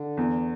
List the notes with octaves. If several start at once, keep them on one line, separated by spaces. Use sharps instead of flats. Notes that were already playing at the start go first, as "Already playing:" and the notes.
Already playing: D3
E2